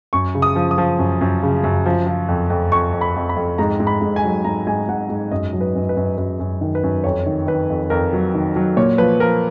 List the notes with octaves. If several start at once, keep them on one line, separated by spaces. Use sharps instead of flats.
F#2 C#6
C#3
D#6
F3
D#6
F3
F#2
F#2
C#3
F#2
F3
F3
F2
F2
F2 C#6
F2
B5
F2
B5
F2
G#2 A#5
G#2
B5
G#2
G#5
F#3
G#2 A#5
G#2 G#5
G#2 F#5
G#2
F#2 D#5
F#3
B4
F#2
B4
F#2
F#2 B4
F#2
D#3
B4
F#2
F2 C#5
D#3
D#3 B4
F2
F2 A#4
F#3
D#3
F#3
A#2 C#5
F3 B4
F3 A#4